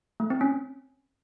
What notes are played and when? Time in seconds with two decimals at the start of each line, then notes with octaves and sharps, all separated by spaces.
0.20 A3
0.30 C4
0.41 C#4